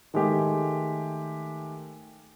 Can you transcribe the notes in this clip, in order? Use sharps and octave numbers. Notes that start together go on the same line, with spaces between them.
D#3 G#3 A3 G4